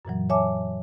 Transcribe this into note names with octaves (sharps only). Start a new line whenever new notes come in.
F#2 A#2 E3 F#3
C#5 E5 G#5 A5 D6